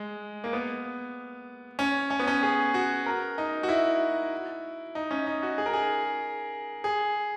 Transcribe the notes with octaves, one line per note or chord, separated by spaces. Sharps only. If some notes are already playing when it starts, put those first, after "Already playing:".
Already playing: G#3
A#3
B3
C#4
C#4
B3
C#4
G#4
F#4
A#4
D#4
F#4
E4
D#4
C#4
D#4
F#4
G#4
A#4
G#4
G#4